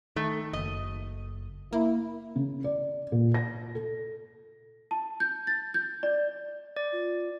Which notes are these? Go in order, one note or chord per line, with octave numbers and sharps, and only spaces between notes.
D#3 A3
F#1 D#5
A#3 E4
C#3
D5
A#2
A#6
A4
A5
G6
A6
G6
D5
D5
F4